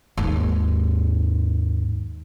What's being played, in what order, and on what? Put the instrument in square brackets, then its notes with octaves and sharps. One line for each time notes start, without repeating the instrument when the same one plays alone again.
[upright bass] D#2 G#2